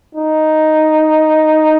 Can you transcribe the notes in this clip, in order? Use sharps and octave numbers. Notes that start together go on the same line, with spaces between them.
D#4